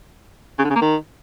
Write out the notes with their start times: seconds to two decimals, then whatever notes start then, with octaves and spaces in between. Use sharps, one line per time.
0.59 C#3
0.64 D3
0.70 C#3
0.76 A#3
0.81 D#3